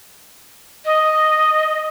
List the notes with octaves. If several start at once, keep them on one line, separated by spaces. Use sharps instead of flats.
D#5